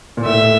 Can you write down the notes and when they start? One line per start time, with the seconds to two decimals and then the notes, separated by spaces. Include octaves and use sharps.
0.17 A#2
0.25 A2 E5